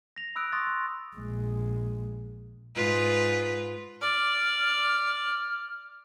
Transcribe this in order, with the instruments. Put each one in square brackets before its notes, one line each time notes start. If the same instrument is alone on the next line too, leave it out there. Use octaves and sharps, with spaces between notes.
[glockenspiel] A#6 F7
B5 D#6 E6 F#6 D7
C6 C#6 D#6 F#6 A6 A#6
C6
[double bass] A#1 G#3
[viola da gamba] G#2 F4 B4
[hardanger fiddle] D5 [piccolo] F6